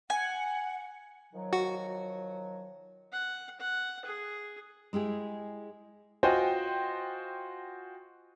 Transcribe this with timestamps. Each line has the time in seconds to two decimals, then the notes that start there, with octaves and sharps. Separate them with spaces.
0.10 F#5 G#5
1.33 D#3 F3 F#3
1.53 F#4
3.12 F#5
3.60 F#5
4.05 G#4
4.93 G#3 E4 G4 G#4
6.23 F4 F#4 C5 D#5 G5 G#5